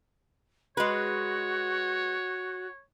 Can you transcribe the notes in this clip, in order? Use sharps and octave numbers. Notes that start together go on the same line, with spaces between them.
G#3 F#4 B4 C#5